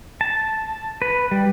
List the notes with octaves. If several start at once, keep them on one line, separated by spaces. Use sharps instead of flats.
A5
B4
G3